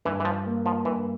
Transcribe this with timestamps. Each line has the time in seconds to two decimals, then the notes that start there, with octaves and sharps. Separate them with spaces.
0.05 G2 E3
0.20 E3
0.25 F3
0.46 A#3
0.66 F3
0.85 G2 E3